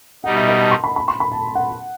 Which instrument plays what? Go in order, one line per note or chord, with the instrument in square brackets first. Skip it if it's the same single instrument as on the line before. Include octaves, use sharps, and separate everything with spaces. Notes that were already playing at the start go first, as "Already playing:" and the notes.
[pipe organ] B2 G3 D#4 [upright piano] F#5
[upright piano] E5
D#5
A5
C6
B5
B5
C6
B5
A5
F#5